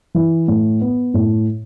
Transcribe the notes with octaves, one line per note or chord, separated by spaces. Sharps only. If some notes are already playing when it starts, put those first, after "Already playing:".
E3
A2
B3
A2